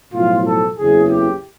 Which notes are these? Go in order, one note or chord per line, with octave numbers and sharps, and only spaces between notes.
B1 A2 F3 F4
A4
F#1 E2 C#3 E3 G#4
G4